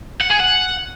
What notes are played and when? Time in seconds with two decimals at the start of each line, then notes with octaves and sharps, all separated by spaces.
0.21 F#5
0.31 G#4
0.40 F#5